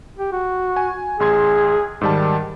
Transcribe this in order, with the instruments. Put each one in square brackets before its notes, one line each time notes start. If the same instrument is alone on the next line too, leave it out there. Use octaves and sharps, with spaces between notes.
[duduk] G4
F#4
[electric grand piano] G#5
[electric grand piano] A1 C6 G#6 [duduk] G#4
[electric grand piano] G#2 G3 A5 [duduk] D#3